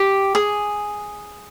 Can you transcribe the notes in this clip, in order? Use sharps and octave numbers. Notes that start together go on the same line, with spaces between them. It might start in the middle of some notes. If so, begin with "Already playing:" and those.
Already playing: G4
G#4